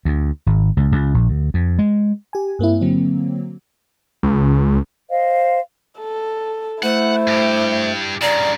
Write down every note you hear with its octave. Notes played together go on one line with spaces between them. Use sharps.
D2
G#1
C#2
C#2
A#1
D2
F2
G#3
G4 G#5
G2 A#3 C4 E4
D3 F#3 A#3 C4
C#2
C5 D#5 F5
A4
A3 E4 C5 F#5
G2 G4
G2 C#3 D5 A#5